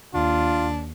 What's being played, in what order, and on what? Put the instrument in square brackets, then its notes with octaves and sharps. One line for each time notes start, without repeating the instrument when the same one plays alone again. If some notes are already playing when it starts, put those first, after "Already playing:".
[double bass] D#2 [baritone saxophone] D4 [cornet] F4